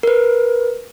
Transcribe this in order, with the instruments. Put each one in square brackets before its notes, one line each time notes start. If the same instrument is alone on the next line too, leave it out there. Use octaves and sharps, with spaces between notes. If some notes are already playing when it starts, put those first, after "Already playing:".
[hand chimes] A#4 B4